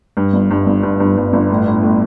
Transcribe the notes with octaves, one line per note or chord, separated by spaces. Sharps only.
G2
G1
G2
G1
G2
G2
G2
G1
A2
A2
A2